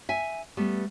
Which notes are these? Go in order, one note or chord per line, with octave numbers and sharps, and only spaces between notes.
E5 G#5
G3 A3 B3